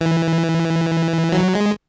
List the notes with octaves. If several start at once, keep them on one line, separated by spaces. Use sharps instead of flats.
E3
F#3
G#3